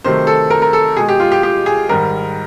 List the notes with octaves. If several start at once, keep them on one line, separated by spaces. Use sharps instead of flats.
C3 D#3 F#3 A3 C5
A4
A#4
A#4
A4
B2 G#3 G#4
G4
F4
G4
G4
G#4
G#2 D#3 G3 A#4